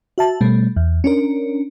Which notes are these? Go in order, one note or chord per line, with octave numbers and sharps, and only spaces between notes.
F#4 E5 A5
B2 G3 A3
E2
C#4 D4 A#4